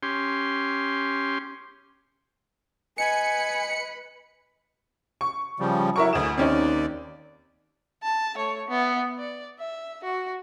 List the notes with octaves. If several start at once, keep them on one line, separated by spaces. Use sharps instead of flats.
C#4 G4 C6
B4 D#5 G#5 B5 C#7
C#6
C#3 F3 G3
F#3 E4 A#4 C#6
D2 G#4 E7
D#2 C4 C#4 D#4 D5
A5
A3 C#5
B3 E5
D5
E5
F#4